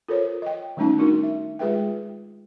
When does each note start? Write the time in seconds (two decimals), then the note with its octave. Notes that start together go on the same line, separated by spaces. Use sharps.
0.08 F4 A4 A#4 C5 C#5
0.42 D#5 G5
0.77 D#3 G3 A3 C#4 D#4 A5
0.99 D4 D#4 F#4 A#4
1.23 E5
1.59 G#3 F4 G#4 B4 E5 G5